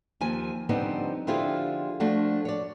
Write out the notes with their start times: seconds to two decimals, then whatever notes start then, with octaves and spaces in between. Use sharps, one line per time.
0.21 D#2 F3 G#5
0.69 D3 F3 G3 B3 C4 D#4
1.27 D3 F3 E4 F4 G4 G#4
2.00 F3 A3 D4 F#4
2.45 C#5 D5